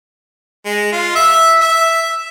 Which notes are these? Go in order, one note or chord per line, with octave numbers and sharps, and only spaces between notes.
G#3
F4
E5
E5